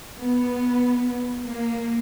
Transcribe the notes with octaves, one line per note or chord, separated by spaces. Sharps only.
B3
A#3